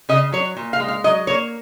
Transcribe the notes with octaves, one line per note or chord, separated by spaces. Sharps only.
C#3 D#5
F#3 C#5
A#2
F5
G#3
F5
F#3 D#5
A#3 C#5